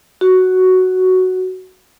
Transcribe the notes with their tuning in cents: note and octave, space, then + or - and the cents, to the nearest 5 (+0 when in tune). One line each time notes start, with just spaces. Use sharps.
F#4 +5